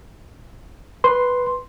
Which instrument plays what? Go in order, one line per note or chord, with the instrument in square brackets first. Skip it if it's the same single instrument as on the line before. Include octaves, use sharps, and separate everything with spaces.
[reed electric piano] B4 C6